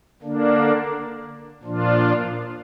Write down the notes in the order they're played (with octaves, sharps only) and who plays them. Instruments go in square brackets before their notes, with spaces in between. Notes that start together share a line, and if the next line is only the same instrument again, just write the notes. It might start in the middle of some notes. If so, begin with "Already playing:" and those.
[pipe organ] D3 A#3 D4
A#2 F3 D4 F4